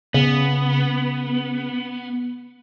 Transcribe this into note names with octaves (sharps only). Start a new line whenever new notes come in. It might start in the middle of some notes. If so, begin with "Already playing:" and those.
C#3 B3